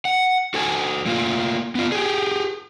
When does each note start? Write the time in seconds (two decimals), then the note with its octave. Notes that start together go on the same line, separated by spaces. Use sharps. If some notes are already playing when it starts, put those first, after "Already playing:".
0.05 F#5
0.54 F#4 A4 G#5
1.06 A3 A#3 F4
1.75 B3 F4
1.92 G4 G#4